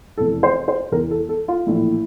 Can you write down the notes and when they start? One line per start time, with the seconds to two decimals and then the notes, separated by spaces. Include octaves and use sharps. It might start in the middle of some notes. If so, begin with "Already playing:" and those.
0.17 F1 E2 E3 A4
0.43 C5
0.68 C5
0.92 E2 E3 A#4
1.11 A4
1.29 A4
1.48 F4
1.66 A#1 A2 E3 E4